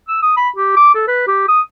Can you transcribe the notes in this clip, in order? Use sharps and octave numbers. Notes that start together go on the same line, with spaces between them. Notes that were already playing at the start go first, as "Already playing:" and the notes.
E6
D#6
B5
G4
D6
A4
B4
G4
D#6